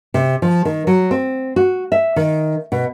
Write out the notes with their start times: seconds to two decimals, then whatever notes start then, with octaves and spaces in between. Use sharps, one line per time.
0.14 C3
0.42 F3
0.65 D#3
0.87 F#3
1.11 C4
1.56 F#4
1.92 E5
2.16 D#3
2.72 B2